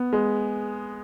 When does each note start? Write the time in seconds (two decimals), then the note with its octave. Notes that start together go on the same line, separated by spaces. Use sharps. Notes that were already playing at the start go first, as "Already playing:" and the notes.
Already playing: B3
0.13 G#3